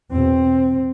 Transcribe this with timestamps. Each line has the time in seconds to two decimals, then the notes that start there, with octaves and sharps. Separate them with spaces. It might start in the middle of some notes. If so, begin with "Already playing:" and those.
0.12 E2 B2 C4